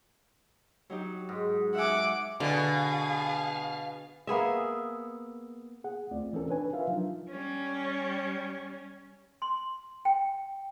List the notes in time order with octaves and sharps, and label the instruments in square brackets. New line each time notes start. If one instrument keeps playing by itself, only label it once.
[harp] F#3 D#4 G4
[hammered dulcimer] G#2
[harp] E5 G#5 [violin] F#5 D6
[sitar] B2 [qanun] D3 [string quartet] G#4 [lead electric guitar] F5
[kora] A#3 B3 G#4 E5
[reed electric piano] G#4 F#5
D2 A3 C4 F4 D5
E3 C4 C#4 A4 A#4
D4 D#4 B4 C#5 G#5
F4 G4 A#4 B4 E5 F5
F3 F#3 D4 D#4 F4
[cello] G3 C#4
[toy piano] C6
G5